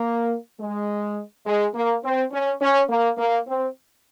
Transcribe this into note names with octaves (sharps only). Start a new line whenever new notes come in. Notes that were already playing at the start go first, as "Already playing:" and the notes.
Already playing: A#3
G#3
G#3
A#3
C4
C#4
C#4
A#3
A#3
C4